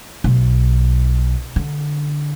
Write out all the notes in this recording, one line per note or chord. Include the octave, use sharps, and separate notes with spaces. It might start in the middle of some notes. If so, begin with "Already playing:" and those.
B1
D3